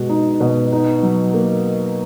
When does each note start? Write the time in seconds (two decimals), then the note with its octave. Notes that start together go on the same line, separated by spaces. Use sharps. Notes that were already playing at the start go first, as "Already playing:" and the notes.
Already playing: B2 G#3 F#4
0.09 D#4
0.41 B2
0.72 D#4
1.03 F#3
1.34 A#3